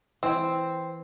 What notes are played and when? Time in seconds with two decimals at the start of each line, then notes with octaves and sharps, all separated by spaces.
0.23 E3 C4